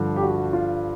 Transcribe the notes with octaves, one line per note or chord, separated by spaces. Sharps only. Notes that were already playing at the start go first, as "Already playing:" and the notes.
Already playing: G2 D3 F3
G4
F#4
F4